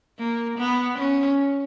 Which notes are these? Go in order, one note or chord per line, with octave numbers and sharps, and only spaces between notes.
A#3
B3
C#4